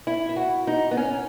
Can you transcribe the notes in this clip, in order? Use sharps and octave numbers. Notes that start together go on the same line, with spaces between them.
E4
E4
F#4
D#4
B3
C#4